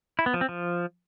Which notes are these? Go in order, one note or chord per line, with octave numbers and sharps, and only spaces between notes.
E4
B3
F3
C4
F3